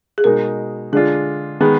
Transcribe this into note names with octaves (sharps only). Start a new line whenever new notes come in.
G#4
B2 G#3 D#4 A#4
D3 G#3 D4 F4 G#4
D#3 G#3 B3 G#4